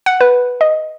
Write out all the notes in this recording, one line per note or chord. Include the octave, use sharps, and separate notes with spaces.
F#5
B4
D#5